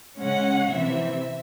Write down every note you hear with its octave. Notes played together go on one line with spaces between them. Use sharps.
C#3 G#3 C#4 F#5
C3 E3 C4 E5